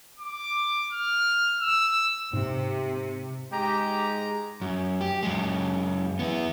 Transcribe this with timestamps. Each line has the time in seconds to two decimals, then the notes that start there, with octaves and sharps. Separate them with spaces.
0.20 D6
0.93 F6
1.61 E6
2.33 G#2 C3
3.51 G#2 G#3 G4 A#5
4.61 F#2
5.01 G4
5.23 F#2 G#3
6.19 E3 B3